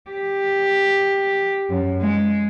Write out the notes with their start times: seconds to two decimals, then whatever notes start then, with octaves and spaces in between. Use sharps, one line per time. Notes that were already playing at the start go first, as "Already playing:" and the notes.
0.10 G4
1.70 F#2
2.01 G#3